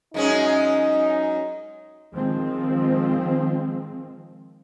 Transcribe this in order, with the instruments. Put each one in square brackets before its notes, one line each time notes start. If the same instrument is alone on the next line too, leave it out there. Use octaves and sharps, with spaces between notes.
[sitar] F#2 G#3 C#4 [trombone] D#4
[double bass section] D#3 F3 G#3 C4